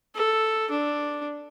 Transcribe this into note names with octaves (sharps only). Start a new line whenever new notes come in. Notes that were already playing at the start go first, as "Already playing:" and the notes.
A4
D4